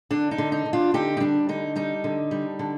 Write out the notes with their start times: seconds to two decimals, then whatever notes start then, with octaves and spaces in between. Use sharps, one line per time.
0.11 D3 D4
0.31 D#4
0.38 D3
0.52 D#4
0.66 D3
0.73 D4 F4
0.94 D3 D#4 G4
1.17 D#4
1.20 G3 D4
1.49 D3 D#4
1.76 G3 D#4
2.04 D3
2.31 G3
2.59 D3